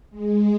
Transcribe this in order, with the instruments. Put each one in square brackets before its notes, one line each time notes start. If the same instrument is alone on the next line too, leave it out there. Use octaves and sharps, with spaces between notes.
[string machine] G#3